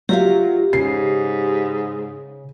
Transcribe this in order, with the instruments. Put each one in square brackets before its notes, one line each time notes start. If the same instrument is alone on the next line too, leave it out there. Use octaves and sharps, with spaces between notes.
[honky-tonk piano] F#3 [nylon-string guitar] F4 E5 F5 [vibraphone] G4
[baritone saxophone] G#2 [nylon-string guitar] C#3 [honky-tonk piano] C7